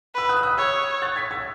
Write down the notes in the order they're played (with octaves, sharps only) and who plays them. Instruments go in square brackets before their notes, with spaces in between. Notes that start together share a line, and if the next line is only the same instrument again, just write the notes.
[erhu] B4 [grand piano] E6
[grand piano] D#6 F#6
E6
D#6 F#6
[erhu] C#5 [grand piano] E6 G#6
[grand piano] F#6 A6
G#6 B6
E6 G#6